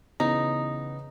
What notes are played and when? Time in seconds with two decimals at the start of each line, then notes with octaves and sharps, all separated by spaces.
0.20 C#3 E3 B3 D#4